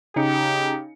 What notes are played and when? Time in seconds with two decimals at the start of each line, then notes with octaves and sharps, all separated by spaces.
0.16 C#3 D#4 G4 C#7